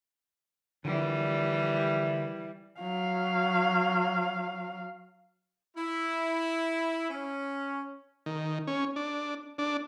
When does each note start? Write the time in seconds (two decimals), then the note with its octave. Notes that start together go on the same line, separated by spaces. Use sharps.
0.85 D3 E3 F3 G3
2.80 F#3 F5
5.76 E4
7.10 C#4
8.26 D#3
8.67 C#4
8.96 D4
9.58 D4